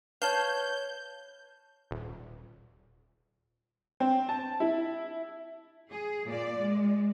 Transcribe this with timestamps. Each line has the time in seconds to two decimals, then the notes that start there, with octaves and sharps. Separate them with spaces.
0.22 B4 C#5 F5 A5 G6
1.91 D#1
4.00 C4
4.29 A5
4.60 E4
5.90 G#4
6.27 A#2 D5
6.60 G#3